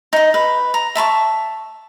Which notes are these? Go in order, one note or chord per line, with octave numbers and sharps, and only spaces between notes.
D#4 D#5
B4
A#5
E5 A5 B5 C#6